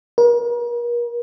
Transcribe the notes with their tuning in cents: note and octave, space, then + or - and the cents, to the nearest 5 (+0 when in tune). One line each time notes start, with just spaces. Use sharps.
A#4 +40